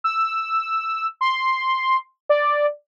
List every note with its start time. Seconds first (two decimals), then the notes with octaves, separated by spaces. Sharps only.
0.04 E6
1.21 C6
2.29 D5